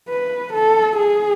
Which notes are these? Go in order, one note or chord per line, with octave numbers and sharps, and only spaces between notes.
B4
A4
G#4